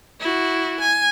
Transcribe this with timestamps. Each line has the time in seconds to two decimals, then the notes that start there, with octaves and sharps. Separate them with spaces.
0.20 E4 F#4
0.80 G#5